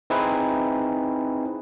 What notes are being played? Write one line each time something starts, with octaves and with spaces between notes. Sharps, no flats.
C4 D#4 E4 G#4 B4